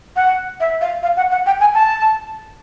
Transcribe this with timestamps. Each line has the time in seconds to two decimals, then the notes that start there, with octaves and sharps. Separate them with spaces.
0.16 F#5
0.60 E5
0.81 F5
1.03 F5
1.17 F#5
1.31 F#5
1.46 G5
1.60 G#5
1.75 A5